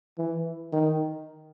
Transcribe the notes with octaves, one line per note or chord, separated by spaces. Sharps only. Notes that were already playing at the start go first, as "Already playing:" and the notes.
E3
D#3